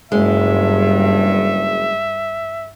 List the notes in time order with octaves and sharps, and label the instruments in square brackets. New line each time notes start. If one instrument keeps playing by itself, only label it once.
[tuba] F#1 [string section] G2 [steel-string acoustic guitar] G#3 [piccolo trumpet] E5